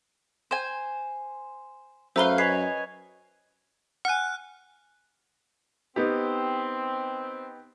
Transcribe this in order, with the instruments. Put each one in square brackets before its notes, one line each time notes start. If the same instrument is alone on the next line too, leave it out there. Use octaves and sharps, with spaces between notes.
[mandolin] C5 G#5
[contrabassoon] F#2 [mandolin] A3 B4 F5 [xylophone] C5 A#5 G7
[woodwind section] C#4 D#5 G#5 [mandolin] B4 C#5 [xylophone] C7
[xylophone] F#5 G#5 [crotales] F6 F#6
[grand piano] B3 D#4 G4 [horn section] C4